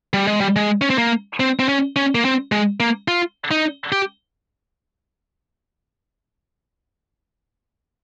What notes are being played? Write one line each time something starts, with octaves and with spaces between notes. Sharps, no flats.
G3
G#3
G3
G#3
C#4
C4
A#3
C4
C4
C#4
C#4
A#3
C4
G#3
A#3
F4
D#4
G4